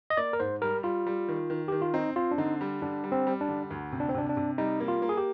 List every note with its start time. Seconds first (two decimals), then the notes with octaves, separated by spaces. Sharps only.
0.10 D#5
0.17 A#3 D5
0.33 A#4
0.40 G#2 C5
0.62 G3 A#4
0.83 G3 F4
1.06 G3
1.29 D#3
1.50 D#3
1.68 D#3 G4
1.82 F4
1.94 C4 D#4
2.16 C4 F4
2.31 D4
2.38 D3 D#4
2.61 G3
2.82 D3 D4
3.04 G3
3.12 C4
3.27 G3
3.41 D4
3.49 D3
3.71 D2
3.92 C3
4.00 D4
4.09 C4
4.14 C3 D4
4.29 D4
4.37 C3
4.58 G3 D#4
4.80 A#3
4.88 F4
5.02 A#3
5.09 G#4
5.17 G4